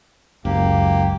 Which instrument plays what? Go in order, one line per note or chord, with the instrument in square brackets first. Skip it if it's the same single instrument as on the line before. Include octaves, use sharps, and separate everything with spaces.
[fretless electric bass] F#1 [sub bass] C#2 [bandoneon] A#3 G4